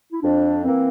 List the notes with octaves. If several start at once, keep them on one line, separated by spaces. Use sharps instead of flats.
E4
F2 D4
E3 A#3 C4